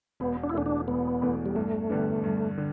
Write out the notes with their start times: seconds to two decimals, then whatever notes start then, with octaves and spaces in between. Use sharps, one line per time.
0.20 E1 B3
0.43 D4
0.49 E4
0.54 E2 B2 A3 D4
0.66 D4
0.88 E1 B3
1.22 E2 B2 A3
1.46 G3
1.56 G2 A3
1.90 D3 G3 B3 D4
2.24 G2
2.58 D3